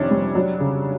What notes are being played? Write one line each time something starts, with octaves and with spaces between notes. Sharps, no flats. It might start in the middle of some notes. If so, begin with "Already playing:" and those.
Already playing: F2 C3 D#3 C#4 D4
G3
F#3
C#3